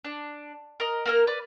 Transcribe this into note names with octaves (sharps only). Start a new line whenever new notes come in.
D4
A#4 D#5
A#3 A#4 F6
B4 D5